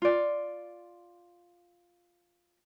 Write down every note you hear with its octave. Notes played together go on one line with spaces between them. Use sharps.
F4 D5